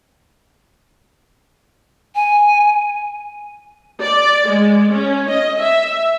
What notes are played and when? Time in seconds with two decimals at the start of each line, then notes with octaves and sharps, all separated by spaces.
2.15 G#5
4.02 D5
4.48 G#3
4.93 C#4
5.29 D#5
5.60 E5